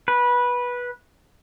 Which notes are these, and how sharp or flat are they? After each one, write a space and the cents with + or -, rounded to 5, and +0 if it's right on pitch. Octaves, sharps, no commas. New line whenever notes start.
B4 -15